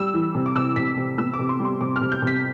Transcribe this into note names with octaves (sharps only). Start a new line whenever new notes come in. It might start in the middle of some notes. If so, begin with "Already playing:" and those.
Already playing: G3 E6
E3
C3
D6
C3 E6
C3 B6
C3
B3 E6
D6
C3
C6
G3
C6
C3 D6
F6
C3
G6
C3 B6